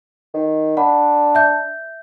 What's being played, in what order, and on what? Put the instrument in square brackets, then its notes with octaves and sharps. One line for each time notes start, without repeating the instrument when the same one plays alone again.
[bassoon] D#3
[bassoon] D4 [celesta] F#5 B5
[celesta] E5 G6